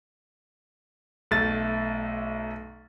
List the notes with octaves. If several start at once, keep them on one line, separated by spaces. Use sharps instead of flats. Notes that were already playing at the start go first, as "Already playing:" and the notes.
B1 A3 E5 A6